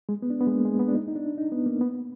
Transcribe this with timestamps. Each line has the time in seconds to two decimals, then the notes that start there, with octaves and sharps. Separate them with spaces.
0.09 G#3
0.22 B3
0.30 D4
0.41 B3
0.47 G#3
0.52 A#3
0.65 G#3
0.79 B3
0.88 D4
0.94 D#4
1.08 D#4
1.16 D4
1.37 D#4
1.52 B3
1.66 A#3
1.81 B3